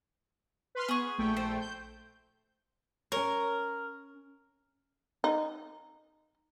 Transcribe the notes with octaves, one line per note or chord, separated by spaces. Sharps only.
B4 C6 F6
B3 G#4 C#6
A#1 A3 G5
C5
G6
C#4 A#4 C#5
D#4